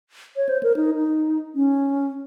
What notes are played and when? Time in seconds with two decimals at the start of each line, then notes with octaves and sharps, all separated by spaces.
0.36 C#5
0.49 C5
0.63 A#4
0.76 D#4
0.96 D#4
1.55 C#4